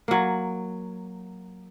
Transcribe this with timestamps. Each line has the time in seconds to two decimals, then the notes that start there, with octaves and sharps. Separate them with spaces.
0.08 F#3 A#3